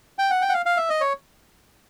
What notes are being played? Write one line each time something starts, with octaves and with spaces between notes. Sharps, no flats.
G5
F#5
G5
F#5
F5
F5
E5
D#5
C#5